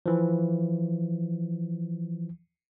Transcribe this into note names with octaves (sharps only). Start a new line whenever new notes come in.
E3 F3